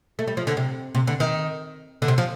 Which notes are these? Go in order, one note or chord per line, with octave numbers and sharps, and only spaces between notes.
A3
G3
F3
D3
C3
C3
D3
D#3
D3
C3
F3